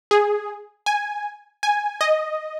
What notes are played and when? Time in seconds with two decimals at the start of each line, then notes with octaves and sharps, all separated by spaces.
0.11 G#4
0.86 G#5
1.63 G#5
2.01 D#5